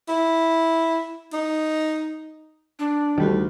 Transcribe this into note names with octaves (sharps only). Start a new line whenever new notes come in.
E4
D#4
D4
D2 D#3 G3